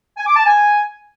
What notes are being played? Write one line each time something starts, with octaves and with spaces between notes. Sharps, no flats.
G#5
D6
A5
G#5